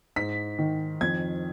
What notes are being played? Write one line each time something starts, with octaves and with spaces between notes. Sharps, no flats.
G#2 B6
D#3
F2 G#6